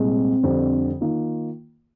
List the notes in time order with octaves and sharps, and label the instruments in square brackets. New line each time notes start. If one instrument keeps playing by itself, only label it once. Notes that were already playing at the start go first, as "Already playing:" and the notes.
Already playing: [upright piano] C2 A#2 G#3 [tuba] C4
[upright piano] F2 D3 G3 D4
D#3 A#3 F4